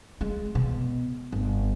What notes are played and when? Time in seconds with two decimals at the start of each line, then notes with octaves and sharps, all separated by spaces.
0.21 G#3
0.55 B2
1.32 G1